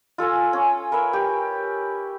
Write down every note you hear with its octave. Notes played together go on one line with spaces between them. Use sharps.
F4 A4 G#5 A#5
C#4
A#4 B4 E5
G4